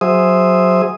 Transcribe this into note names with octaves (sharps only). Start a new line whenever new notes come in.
F#3 G#4 C5 E5 D#6